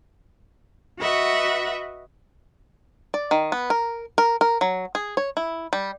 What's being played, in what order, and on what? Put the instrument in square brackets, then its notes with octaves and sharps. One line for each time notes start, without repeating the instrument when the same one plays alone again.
[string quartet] F#4 B4 D#5 E5 F#5
[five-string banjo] D5
D#3
B3
A#4
A#4
A#4
F#3
G#4
C#5
E4
G3